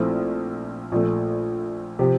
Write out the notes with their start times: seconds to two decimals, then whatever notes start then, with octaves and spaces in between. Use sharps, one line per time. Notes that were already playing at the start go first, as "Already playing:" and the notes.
Already playing: A#1 A#2 A3 C4 E4
0.92 A#1 A#2 A3
1.99 C3 F3 C4 G4